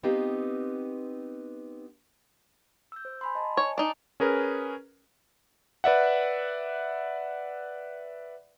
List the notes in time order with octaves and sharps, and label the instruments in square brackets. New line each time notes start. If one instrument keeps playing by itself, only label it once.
[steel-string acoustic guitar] B3 C4 D#4 F4 G4
[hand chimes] E6 G6
C5
G#5 B5 C6
D#5 A5 A#5
[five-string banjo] C#5 [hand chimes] G#5
[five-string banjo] D4 D#4
[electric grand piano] C#4 G#4 A#4 B4
B4 D5 E5 F#5